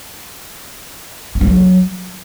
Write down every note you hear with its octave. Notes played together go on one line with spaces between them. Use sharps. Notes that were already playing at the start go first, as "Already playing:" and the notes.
D4
F3
F#3